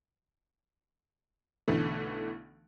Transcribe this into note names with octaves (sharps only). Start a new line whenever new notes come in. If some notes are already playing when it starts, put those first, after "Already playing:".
B1 D3 E3 A3